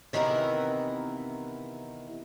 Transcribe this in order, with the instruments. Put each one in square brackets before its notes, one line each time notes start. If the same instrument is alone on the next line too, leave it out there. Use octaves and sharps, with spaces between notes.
[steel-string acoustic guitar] C3 D#3 E3 B3 E4 A#4